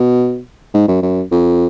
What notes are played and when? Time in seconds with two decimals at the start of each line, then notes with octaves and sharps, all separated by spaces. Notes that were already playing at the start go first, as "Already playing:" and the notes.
Already playing: B2
0.74 G#2
0.88 F#2
1.02 F#2
1.32 F2